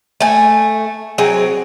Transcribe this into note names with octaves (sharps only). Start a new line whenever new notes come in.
A3 G#5
F#3 C4 G#4